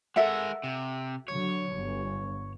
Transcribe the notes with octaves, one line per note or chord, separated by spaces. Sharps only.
G#3 A4 A#4 E5 F#5
C3
D3 F#3 C#5
G1